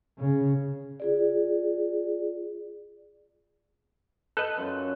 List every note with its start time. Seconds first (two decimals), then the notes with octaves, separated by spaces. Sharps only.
0.19 C#3
1.00 F4 G#4 D5
4.37 A4 B4 D#5 F#6
4.58 F#2 F4